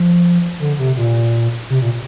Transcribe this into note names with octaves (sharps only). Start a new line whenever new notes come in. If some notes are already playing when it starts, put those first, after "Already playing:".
Already playing: F3
D3
C3
A#2
C3
A#2